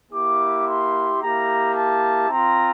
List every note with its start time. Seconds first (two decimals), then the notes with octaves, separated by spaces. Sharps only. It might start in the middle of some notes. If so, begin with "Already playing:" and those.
0.12 A#3 E4 G4 D6
0.66 C6
1.20 A#3 E4 G4 A#5
1.75 A5
2.29 C4 F4 A#5